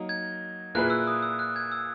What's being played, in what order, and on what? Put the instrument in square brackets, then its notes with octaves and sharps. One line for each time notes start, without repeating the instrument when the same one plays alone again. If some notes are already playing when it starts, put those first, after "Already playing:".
Already playing: [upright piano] F#3 A#3 D#4
[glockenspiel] G#6
[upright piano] A#2 A#3 E4 G#4 B4 [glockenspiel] F#6
[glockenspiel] E6
D#6
E6
F#6
G#6
E6